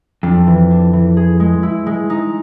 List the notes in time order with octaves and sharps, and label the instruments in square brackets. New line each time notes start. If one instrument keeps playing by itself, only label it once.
[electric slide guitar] F2 [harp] D4
[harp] E3
D4
E3
G#4
G#3
E4
G#3
D#4